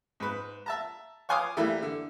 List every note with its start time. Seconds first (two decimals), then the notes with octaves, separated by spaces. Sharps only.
0.20 G#2 B4
0.66 E5 A5 A#5
1.29 C#5 F5 G#5 C6 D6 D#6
1.57 E3 G3 A3 A#3 E4
1.82 D3